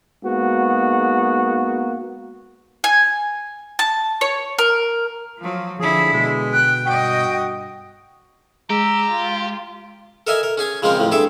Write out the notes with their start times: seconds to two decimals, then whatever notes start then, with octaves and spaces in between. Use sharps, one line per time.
0.23 G#2 A#3 B3 F#4
2.84 G#5
3.79 A5
4.21 C#5
4.59 A#4
5.38 F3 F#3 F4
5.80 D3 F3 E4 G#4
6.13 B2 G#3
6.53 G5 F#6
6.85 G2 F#4 D#5 G5
8.70 G#3 G4 A#5 E6
9.11 F4
10.27 A4 A#4 D#5 E5 G#5
10.43 A#4
10.57 C#4 G#4 G#5
10.82 C#3 F3 G#3 C4 C#4 A#4
10.99 A1 F2 F3
11.11 G2 G#4 A4 E5 D6